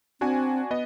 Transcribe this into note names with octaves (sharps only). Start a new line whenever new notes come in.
C4 D4 F#4 G#5
B3 D#5